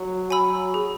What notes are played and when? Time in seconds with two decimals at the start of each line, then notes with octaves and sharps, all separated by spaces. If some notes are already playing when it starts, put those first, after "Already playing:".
Already playing: F#3
0.30 F#3 G#5 B5 E6
0.74 G#4